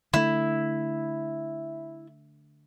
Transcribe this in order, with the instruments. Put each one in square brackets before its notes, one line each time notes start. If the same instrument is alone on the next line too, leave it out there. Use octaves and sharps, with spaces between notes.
[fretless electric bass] D3 A3 [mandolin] E4